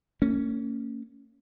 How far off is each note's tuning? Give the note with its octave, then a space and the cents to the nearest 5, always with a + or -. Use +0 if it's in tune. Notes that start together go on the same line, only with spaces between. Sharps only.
A#3 -40 C#4 +0